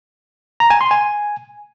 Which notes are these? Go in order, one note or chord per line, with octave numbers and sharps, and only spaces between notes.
A#5
G#5
C6
G#5